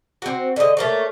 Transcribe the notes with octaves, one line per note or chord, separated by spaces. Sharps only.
C4 F#4
D3 D#5
A3 A#3 C#5